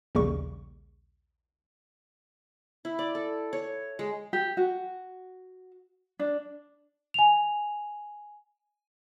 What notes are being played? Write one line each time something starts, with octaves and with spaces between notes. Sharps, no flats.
A#1 D#2 C#3 G3 C#6
E4
D5
A4
C#5
G#3
G4
F#4
D4
G#5 F7